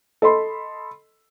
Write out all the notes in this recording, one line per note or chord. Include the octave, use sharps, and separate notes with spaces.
A4 D#5 B5 C6